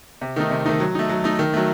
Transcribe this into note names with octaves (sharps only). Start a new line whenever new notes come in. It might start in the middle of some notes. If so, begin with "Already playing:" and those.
C3
D#3 A3 D#4
C3
D#3 A3 D#4
F#3
A3 D#4
F#3
A3 D#4
D#3
F#3 A3